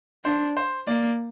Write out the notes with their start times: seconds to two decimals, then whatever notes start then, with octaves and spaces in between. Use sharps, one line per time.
0.25 D4 C5
0.57 C5
0.87 A#3 D5